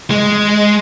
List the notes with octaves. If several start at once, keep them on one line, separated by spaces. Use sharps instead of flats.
G#3